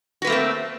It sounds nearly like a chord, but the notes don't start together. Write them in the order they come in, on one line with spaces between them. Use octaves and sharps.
F#4 B4 A#3 A3 C4